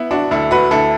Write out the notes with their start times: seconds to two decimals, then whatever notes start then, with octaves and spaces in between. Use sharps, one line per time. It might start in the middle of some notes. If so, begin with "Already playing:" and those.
Already playing: B3 E4
0.11 D4 F#4
0.31 D2 E4 A4
0.51 F#4 B4
0.71 D2 E4 A4